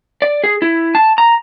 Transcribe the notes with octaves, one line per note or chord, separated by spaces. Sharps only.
D5
G#4
E4
A5
A#5